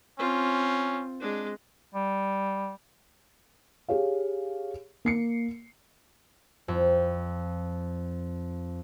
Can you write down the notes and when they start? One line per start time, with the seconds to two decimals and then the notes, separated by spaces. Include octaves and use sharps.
0.19 C4 C#4 F4
1.20 G#3 D4
1.95 G3
3.88 G4 G#4 C#5 F5
5.05 A#3 C7 C#7
6.68 F2 C4